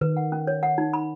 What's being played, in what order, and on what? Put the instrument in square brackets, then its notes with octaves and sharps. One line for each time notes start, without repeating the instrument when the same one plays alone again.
[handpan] D#3 [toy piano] B4
[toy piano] F#5
C#4
C#5
F#5
D#4
B5